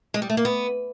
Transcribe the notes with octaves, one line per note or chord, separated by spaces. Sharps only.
G#3
G3
A3
A#3
B3